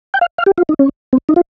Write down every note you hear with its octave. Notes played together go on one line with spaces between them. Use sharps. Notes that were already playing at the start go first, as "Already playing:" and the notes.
G5
F5
F5
G4
F4
D#4
C#4
C4
D#4
F4